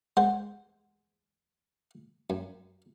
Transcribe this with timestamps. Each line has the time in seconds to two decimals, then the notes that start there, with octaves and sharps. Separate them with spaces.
0.17 G#3 C5 F#5
2.30 F#2